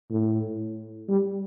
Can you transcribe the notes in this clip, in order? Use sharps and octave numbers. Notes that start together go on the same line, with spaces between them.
A2
G3